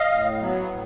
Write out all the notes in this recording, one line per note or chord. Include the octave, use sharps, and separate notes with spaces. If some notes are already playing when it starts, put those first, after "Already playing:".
Already playing: D#5 F5
A2
F#3 B3
A2